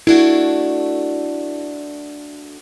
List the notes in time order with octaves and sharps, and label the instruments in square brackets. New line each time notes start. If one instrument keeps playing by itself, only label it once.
[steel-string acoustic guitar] A3 D4 F#4 [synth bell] E4